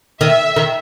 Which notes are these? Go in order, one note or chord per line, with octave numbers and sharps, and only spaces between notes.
D#3 E5
D#3